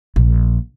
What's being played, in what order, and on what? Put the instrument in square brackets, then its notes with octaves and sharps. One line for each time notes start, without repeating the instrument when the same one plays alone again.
[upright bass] A#1